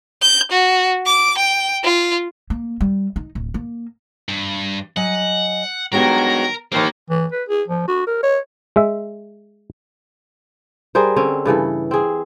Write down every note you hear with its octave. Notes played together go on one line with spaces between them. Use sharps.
G6
F#4
D6
G5
F4
A#3
G3
D#4
D1
A#3
G2
F#3 D#5 F#5 G#5
G2 D#3 F#3 G#3 B3 G4 A#4
D#2 E3 A#3 C5
E3
B4
G#4
F3
F#4
A#4
C#5
G#3 E5
G3 G#4 A#4 C5
D3 C4 C#4
G2 C#3 E3 A4
C4 G#4